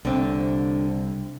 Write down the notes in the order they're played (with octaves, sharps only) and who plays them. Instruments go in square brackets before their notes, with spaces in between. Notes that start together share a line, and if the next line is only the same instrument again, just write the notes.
[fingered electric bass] C2 [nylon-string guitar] D3 C4